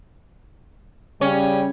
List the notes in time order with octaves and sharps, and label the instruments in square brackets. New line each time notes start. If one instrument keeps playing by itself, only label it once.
[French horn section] C#3 G3 [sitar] C#4